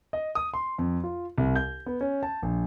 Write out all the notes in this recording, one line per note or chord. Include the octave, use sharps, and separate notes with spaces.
D#5
D#6
C6
F2
F4
C2
G6
B3
C#4
A5
A#1